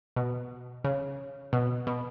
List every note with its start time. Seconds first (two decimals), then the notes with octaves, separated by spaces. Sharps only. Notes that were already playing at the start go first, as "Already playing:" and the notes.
0.16 B2
0.84 C#3
1.53 B2
1.87 B2